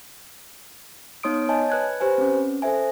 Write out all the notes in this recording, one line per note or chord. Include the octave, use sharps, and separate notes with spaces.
B3 D#4 C#5 C6 D#6 D7
C#5 D#5 G#5 A5
B4 F#6 G#6
G4 B4 C5 G#5
C4 C#4
A4 C5 E5 G#5